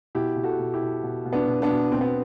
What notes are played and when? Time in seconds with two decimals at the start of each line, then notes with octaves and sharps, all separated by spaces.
0.15 B2 E4 G4
0.36 B2
0.43 F#4 A4
0.59 B2
0.74 E4 G4
0.82 B2
1.03 B2
1.25 B2
1.33 B3 D4
1.47 B2
1.62 B3 D4
1.69 B2
1.92 B2 C4
2.01 B3